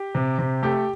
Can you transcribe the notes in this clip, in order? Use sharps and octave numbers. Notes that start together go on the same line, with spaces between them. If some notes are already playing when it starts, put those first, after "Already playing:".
Already playing: G4
C3
C3
A3 G4